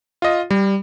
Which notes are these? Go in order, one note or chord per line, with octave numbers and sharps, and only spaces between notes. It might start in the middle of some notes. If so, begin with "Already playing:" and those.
F4 D#5
G3